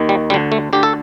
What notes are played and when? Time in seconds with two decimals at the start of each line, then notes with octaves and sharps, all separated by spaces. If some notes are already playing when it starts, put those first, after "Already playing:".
Already playing: D#2 D#3
0.09 G3
0.30 D2 D3 G3
0.52 A3
0.73 D2 D3 G4
0.83 A4